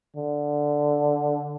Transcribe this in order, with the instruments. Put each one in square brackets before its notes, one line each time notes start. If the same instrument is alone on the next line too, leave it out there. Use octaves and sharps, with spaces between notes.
[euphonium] D3